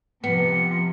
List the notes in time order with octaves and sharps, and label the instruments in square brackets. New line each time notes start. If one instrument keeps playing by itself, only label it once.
[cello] C3 F3 [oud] B3 [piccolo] C#7